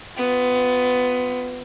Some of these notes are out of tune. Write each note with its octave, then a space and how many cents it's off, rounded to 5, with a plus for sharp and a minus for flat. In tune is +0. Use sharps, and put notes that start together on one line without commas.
B3 +20 F4 +0